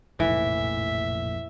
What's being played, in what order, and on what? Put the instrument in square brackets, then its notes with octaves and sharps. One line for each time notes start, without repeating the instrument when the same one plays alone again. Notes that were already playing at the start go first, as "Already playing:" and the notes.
[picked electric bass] F1 A#1 A2 [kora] E3 [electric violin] E5